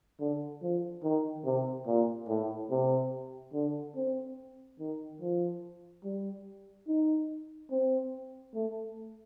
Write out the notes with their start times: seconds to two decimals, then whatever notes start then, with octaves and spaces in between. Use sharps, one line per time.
0.20 D3
0.62 F3
1.04 D#3
1.45 C3
1.87 A#2
2.29 A2
2.70 C3
3.54 D3
3.96 C4
4.80 D#3
5.21 F3
6.04 G3
6.88 D#4
7.71 C4
8.55 A3